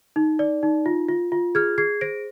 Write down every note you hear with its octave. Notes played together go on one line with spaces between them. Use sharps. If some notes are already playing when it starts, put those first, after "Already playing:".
D#4
D5
D#4
F4
F4
F4
G#4 F6 G#6
G#4 G#6 C7
C5 A#6 D7